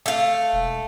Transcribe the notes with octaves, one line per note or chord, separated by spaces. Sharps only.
A3 F5
E1